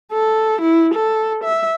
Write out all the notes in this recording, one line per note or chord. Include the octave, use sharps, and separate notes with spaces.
A4
E4
A4
E5